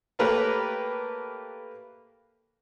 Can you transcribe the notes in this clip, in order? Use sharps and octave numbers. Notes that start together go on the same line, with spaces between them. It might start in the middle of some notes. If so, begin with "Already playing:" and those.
A3 A#3 G4 A#4 B4 C#5